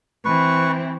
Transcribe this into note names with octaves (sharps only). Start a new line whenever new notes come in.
E3 C4 B4 C#6